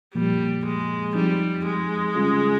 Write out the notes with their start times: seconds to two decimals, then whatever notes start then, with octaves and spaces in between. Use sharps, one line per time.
0.15 A#2 F3 G3 A#3
0.65 G#3
1.15 F3 G3 C4 D#4 G4
1.65 G#3
2.15 C#3 G3 C#4 F4 G#4